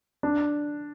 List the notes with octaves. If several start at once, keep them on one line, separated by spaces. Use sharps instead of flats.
D4